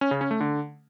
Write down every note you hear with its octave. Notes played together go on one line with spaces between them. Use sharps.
C#4
C#3
C#4
A3
D3